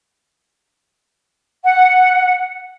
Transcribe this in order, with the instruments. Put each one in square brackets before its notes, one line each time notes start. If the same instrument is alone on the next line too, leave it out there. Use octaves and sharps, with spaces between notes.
[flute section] F#5